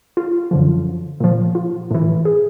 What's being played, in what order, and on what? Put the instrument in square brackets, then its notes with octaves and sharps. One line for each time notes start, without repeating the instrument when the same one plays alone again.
[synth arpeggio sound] F4
F#2 D3 F3
A#2 F3
F4
A2 E3
G#4